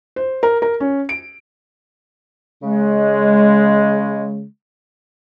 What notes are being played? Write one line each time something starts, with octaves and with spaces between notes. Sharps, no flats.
C5
A#4
A#4
C#4
D7
C#3 G#3